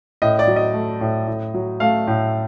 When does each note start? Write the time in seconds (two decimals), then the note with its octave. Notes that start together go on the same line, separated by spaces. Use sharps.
0.22 A2 D#5
0.39 D5
0.47 F#3
0.56 D#5
0.74 A3
1.01 A2
1.27 A2
1.54 F#3
1.80 A3 F5
2.07 A2